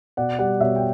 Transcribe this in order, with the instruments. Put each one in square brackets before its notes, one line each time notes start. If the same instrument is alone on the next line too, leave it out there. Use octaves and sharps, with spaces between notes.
[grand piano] B2 D5 F#5
G3 D5 F#5
B2 C#5 E5
G5